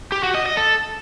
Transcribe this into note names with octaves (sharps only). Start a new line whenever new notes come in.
G4
F#4
D#5
D#5
A4